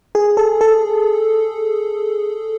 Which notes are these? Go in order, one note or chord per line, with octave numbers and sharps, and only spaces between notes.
G#4
A4
A4